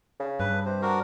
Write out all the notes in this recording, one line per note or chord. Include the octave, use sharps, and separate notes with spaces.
C#3
G2 B4
C3 C5
D4 F#4 A#4